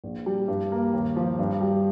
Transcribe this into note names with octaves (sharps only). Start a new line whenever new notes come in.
A#1
G3
G2
A#3
D#2
F3
G2
G3